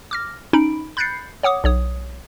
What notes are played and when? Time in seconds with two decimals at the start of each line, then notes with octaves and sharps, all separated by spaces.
0.11 D6 F6 A#6
0.53 C#4 D#4 B5 D7
0.97 B5 F#6 G6 A6 C7 C#7
1.43 C#5 F#5 D6 D#6
1.64 B1 C#5 D#6